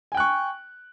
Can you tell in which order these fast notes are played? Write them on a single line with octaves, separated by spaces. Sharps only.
G#5 G5 F#6 C#6